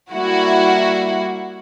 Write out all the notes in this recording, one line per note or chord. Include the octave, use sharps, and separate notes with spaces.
G3 A#3 E4 F#4